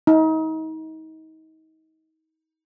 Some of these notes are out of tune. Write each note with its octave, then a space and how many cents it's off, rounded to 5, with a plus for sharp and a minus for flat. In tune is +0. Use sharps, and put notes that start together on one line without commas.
D#4 +35